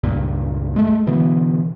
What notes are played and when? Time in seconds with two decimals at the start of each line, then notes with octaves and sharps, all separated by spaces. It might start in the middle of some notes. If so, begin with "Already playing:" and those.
0.04 C#2 G2 A#2
0.76 G#3 A3
1.07 B2 D3 E3 B3